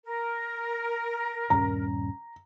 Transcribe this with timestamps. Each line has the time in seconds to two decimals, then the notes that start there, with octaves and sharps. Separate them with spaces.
0.06 A#4
1.50 D#1 G2 C#4 A#5